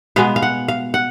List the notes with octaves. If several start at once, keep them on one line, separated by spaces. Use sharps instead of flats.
B2 G#3 B3 F5
F5
F#5
F5
F#5